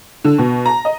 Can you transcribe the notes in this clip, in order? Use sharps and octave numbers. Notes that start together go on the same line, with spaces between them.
D3
B2
A#5
D#5